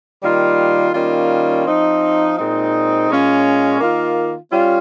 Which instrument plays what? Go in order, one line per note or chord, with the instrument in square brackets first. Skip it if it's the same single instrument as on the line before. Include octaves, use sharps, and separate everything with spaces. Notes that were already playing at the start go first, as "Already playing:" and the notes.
[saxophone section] D#3 G3 A#3 F4
D#3 G3 A#3 C#4 F4
F3 C4 D#4
A#2 G#3 C4 D#4
A#2 G#3 C#4 F4
D#3 A#3 F4
G3 C#4 F4